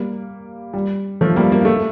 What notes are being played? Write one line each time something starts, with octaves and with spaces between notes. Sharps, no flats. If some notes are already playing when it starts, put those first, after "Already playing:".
Already playing: G3 A#3
G3
F3 A3
G3 A#3
A#3
A3